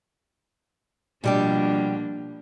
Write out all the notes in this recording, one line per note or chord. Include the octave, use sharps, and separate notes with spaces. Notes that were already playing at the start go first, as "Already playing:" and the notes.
B2 F3 G3 A#3 D4 G4